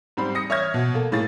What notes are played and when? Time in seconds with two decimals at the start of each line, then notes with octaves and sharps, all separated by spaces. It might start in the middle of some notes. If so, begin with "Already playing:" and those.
0.17 G#2 G3 C4 B5
0.35 D#6 A#6 C#7
0.50 C#5 E5 C#6 F6 G#6 A#6
0.74 B2
0.94 A#3 A4
1.12 A2 A#3 G#4 A6